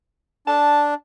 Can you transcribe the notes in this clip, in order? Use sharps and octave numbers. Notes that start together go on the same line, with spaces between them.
D4 A5